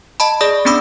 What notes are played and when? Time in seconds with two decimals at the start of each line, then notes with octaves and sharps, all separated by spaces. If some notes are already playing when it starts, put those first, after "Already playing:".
0.20 D#5 A5 B5
0.41 G#4 D5 B5 D#6
0.65 B3 C#4 D4 B5 D6 E6